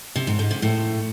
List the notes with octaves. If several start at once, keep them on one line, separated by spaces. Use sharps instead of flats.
C3
G#2
G#2
C3
A2